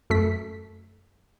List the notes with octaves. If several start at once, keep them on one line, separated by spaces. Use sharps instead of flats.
F#2 A3 B6